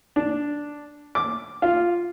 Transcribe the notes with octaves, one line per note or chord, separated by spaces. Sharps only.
D4
D6
F4